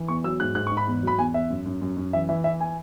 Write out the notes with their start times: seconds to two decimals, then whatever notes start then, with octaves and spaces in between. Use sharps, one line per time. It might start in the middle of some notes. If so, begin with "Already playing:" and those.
Already playing: E3
0.08 E2 C#6
0.24 F#3 E6
0.40 G#2 F#6
0.55 G#2 F#6
0.67 C#6
0.72 G#2
0.77 B5
0.87 E2
1.03 F#3 B5
1.18 E2 G#5
1.34 E2 E5
1.50 F#2
1.66 F#2
1.82 F#2
1.97 F#2
2.13 E3 E5
2.29 E3 E5
2.44 E3 E5
2.60 G#5